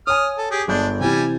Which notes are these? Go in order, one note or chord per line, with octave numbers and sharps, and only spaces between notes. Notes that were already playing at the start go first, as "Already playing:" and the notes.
C#5 G#5 D#6 F6
A4
G4 G#4
G1 G#3 D4 D5 G6
C3 E3 G3 G#5